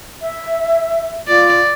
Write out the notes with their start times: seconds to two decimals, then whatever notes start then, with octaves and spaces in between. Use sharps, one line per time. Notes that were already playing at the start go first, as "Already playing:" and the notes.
0.22 E5
1.28 F4 D5